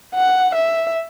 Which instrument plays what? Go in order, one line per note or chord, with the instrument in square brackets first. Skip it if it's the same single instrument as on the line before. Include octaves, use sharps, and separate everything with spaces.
[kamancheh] F#5
E5